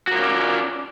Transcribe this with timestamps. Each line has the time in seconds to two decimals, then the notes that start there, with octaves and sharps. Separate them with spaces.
0.07 F#4
0.11 A#4
0.15 F4
0.19 C#4
0.23 D5